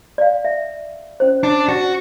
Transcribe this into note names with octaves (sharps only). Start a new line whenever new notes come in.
D5 F5
E5
C#4 C5
D4
F#4